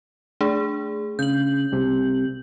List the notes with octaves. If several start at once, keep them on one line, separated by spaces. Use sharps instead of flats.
A3 D4 G#4
C#3 G6 F#7
C2 C3